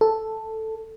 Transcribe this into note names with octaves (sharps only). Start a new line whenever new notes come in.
A4